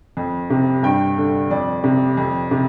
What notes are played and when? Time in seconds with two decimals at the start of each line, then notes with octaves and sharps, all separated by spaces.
0.17 F2
0.50 C3
0.83 G2 G5
1.17 D3
1.51 F2 D5
1.84 C3
2.17 F2
2.51 C3